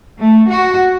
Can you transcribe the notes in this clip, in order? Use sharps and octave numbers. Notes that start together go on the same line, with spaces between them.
A3
F#4